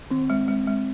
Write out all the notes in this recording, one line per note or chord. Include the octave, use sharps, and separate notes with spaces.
D#3 C4
G#3
G#3
G#3